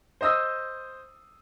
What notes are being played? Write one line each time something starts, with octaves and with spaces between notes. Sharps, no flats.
C5 D#5 D#6 E6 A#6